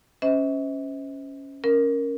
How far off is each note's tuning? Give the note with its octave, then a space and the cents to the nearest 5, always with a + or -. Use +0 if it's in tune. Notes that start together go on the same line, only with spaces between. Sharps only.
C#4 +0 C5 -30 E5 -45
C#4 +0 A#4 +0